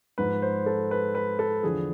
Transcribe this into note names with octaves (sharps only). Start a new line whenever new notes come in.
G#2 F3 B4
C5
A4
B4
B4
A4
E2 D3 F3 G#4